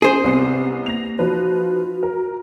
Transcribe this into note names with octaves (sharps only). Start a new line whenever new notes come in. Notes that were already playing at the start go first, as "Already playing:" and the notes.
C#4 G#4 C5
C2 B3 C4 C7
A#3 A#6 F7
F3 D#4 F#4 B4
A#4